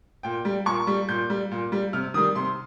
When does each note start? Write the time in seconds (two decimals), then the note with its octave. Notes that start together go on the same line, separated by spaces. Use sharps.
0.23 A#2 G5
0.45 G3
0.66 A#2 C#6
0.87 G3
1.09 A#2 G6
1.30 G3
1.52 A#2
1.72 G3
1.93 C3 F6
2.14 D#3 G3 D#6
2.35 C3 C6